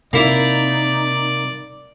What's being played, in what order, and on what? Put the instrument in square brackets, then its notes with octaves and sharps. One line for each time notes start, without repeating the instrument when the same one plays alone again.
[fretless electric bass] C3 [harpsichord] A#3 E4 [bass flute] D#4 [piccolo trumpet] D5